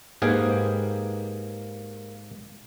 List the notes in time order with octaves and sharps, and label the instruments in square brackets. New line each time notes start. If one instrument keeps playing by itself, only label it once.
[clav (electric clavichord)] G#2 G#4 F5 [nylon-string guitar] A#3 G4 B4